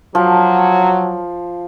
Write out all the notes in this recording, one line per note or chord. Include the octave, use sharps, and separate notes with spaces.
F3 F#3